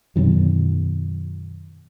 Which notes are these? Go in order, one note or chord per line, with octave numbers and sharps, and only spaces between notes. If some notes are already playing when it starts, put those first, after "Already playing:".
F#2 B2 D#3 F#3